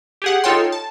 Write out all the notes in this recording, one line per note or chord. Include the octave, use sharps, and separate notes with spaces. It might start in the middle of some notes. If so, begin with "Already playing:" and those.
G4 G#4 F#5
D#4 F4 A4 C#5 G5 C6
A5